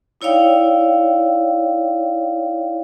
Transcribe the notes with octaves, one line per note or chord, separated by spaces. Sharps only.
D#4 E4 C#5 D5 F5 G5